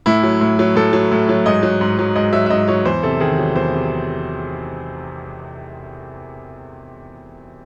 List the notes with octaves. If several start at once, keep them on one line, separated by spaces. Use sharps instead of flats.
A2 E4
F#3
A2
F#3
A2 A4
F#3
A2
F#3
G#2 D#5
F#3
G#2
F#3
G#2 D#5
F#3 E5
E5
G#2 D#5
F#3 C#5
E2 C5
C3 A4
D#3 G#4
F#3
E2 C5
C3